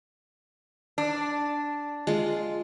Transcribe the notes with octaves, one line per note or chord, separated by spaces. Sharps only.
D4
G#3 F4